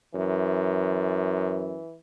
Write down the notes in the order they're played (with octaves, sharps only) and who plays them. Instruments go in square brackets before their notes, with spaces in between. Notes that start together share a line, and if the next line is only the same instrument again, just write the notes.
[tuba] F#2 [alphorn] E3